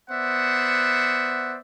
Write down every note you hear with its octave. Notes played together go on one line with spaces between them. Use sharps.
B3 C5 D5 E5 F#5